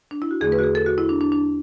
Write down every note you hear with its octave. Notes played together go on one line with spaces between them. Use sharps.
D4
E4
F#4
E2 D3 A3 G#4
B4
F#4
G#4
A4
F#4
E4
D4
D4
D4